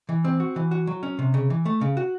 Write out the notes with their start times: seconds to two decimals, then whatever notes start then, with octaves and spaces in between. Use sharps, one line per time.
0.09 E3
0.24 C4
0.40 F#4
0.56 E3
0.71 F#4
0.87 F#3
1.03 C#4
1.19 C3
1.34 C#3
1.50 E3
1.65 A3
1.81 C#3
1.97 F#4